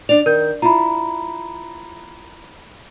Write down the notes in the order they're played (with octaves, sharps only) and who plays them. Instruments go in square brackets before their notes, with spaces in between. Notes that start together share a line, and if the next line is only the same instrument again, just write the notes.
[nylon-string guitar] D4 D5 [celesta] F7
[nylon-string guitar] D#3 [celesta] A#4 G6
[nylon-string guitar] E4 F4 [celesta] A#5 B5